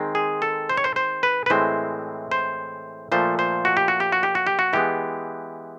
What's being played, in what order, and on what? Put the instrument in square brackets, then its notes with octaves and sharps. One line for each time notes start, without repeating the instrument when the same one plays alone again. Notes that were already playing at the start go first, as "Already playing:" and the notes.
Already playing: [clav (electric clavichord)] D#3 G#3 C4
G#4
A4
C5
C#5
C5
C5
B4
B4
A2 E3 G#3 C4 C5
C5
A#2 F3 A3 C5
C5
F#4
G4
F#4
G4
F#4
G4
F#4
G4
F#4
E3 G#3 B3 G4